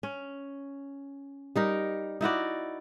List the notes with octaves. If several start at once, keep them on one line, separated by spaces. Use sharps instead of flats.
C#4
G3 D#4 A#4
D#4 E4 F#4 D5